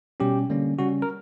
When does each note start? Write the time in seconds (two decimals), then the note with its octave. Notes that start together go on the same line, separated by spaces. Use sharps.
0.20 B2 G3 C#4 G4
0.50 D3 G3 A#3 C#4
0.79 C#3 G3 C#4 F#4
1.02 A#4